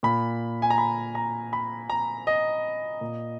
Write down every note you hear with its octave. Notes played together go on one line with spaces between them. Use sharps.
A#2 B5
G#5
A#5
B5
A#5
B5
A#5
D#5
A#2